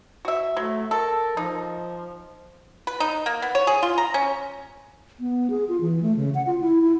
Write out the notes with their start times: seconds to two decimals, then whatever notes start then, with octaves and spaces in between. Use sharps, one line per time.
0.25 F#4 E5
0.57 F#3 A3
0.91 A4 A#4
1.37 F3 D#4
2.87 B4
3.00 D#4
3.26 A#3
3.42 B3
3.55 C#5
3.67 G#4
3.83 F4
3.98 A#5
4.14 C#4
5.20 B3
5.50 G#4
5.69 F4
5.81 E3
6.03 A3
6.17 C#3
6.35 F#5
6.47 F4
6.61 E4
6.82 E4